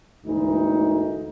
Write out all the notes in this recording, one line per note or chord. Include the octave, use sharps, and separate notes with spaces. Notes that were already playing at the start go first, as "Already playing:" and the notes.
D2 G#2 E3 A#3 D#4